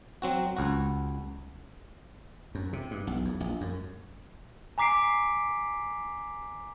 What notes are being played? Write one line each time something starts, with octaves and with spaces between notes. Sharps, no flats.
F#3 C4 F#4
C#2 F#4
F#2
C3
G2
B1
E2
A#1
F#2
G#5 A#5 D6 B6 C7 D7